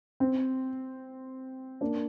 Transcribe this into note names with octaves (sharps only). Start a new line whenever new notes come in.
C4
A#3 D4